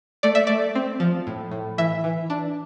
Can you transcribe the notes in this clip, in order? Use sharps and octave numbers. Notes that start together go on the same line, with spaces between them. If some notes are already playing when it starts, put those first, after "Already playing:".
A3 D5
E5
A3 D5
C4
F3
A2
A2
E3 E5
E3
D4